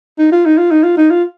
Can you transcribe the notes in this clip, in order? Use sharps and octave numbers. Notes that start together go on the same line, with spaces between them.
D#4
F4
D#4
F4
D#4
F4
D#4
F4